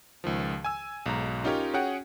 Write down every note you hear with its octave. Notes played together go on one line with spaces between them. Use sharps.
C#2 D#3 F3
G#5 E6
B1 G#2 A#5
C#4 D#4 F4 G4 A#4 C#5
C#4 F#4 G#4 C#5 F#5 G5